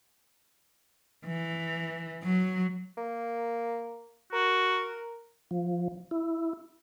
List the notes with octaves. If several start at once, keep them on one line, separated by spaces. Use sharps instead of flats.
E3
F#3
A#3
F#4 A#4
F3
E4